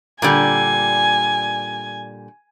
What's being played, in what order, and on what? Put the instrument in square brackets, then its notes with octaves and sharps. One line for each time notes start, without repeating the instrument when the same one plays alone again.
[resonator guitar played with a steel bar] A#2 D3 G3 [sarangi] G#5